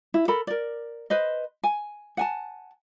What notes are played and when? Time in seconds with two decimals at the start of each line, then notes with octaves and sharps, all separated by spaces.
0.14 E4
0.28 A4 A#4 B5
0.47 A#4 D5
1.10 B4 C5 D#5
1.63 G#5
2.17 F#5 G#5 A5